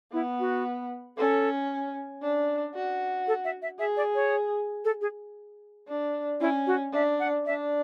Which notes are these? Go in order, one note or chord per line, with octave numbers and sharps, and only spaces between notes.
B3 E4
F#4
C#4 A4
D4
F#4
A4
E5
E5
G#4 E5
D5
C#5
A4
G#4
D4
C#4 E4
F#4
D4 E5
F#5
D4 E5